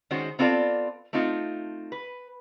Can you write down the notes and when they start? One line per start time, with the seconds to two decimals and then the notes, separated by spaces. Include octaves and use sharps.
0.11 D#3 G#3 C#4 F#4 C5
0.39 B3 C4 F4 A4 D5
1.13 A3 C4 D#4 F4
1.92 B4